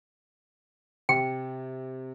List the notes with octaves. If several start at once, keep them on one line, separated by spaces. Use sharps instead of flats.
C3 G5